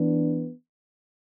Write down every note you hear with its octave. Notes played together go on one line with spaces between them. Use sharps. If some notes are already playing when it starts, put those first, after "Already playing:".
Already playing: E3 B3 D4